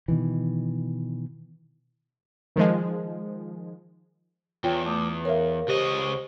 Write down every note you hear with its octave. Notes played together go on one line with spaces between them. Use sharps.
B2 D#3 E3
D#3 F3 G#3
E2 F4 C#5 G5
A3 D6 D#6
B4
A#4 C#5 E5 F5
C#2 G4 C5 D#5